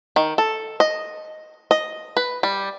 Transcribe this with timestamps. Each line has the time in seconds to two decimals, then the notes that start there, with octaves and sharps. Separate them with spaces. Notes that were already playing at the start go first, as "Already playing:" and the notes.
0.16 D#3
0.38 A4
0.80 D#5
1.71 D#5
2.17 B4
2.43 G3